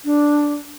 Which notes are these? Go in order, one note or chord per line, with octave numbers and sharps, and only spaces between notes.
D4